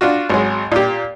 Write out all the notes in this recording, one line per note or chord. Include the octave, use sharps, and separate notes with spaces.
D4 F4 F#4
G#1 F#3 G#3
A#2 G4